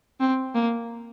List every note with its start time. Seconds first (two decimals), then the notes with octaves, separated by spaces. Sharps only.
0.20 C4
0.54 A#3